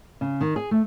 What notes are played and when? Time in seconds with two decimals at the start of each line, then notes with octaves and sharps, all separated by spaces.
0.21 C#3
0.41 D#3
0.56 G#4
0.71 A3